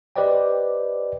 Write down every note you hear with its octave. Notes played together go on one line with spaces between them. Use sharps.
G4 B4 C5 D5 D#5 G5